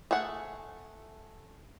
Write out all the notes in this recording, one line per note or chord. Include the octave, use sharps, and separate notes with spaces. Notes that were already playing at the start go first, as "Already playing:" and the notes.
A3 G#4 F#5